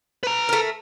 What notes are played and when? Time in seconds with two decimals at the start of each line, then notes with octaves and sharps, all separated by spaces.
0.23 B4 A#5
0.49 A3 A#4